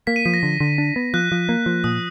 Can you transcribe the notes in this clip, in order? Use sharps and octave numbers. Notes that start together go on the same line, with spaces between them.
A#3 B6
D#7
F3 B6
A#6
D3
D3
D4
B3
F3 F#6
F3
A#3
F3
A#2 D#6